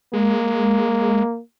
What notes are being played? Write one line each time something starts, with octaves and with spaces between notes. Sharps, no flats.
G#3 A#3